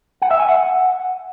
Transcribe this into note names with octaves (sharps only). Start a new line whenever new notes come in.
F#5
E5
G#5
F#5